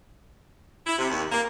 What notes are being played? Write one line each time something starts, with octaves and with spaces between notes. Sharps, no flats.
E4
C3
D#2
A#3